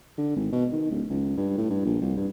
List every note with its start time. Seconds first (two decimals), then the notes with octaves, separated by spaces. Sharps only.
0.18 D3
0.36 G#1
0.52 B2
0.73 D#3
0.91 D1
1.10 C#2
1.37 G2
1.58 A2
1.70 G2
1.85 A#1
2.01 C2
2.17 G2